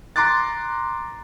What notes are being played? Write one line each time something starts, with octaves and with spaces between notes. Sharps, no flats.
A#5 C6 D6 F#6 A6